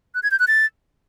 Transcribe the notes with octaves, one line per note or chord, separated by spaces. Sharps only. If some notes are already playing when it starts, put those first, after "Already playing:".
F#6
G#6
G6
F#6
A6